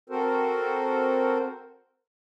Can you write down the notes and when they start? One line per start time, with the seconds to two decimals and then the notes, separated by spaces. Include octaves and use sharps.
0.10 C4 F#4 A4 A#4 C5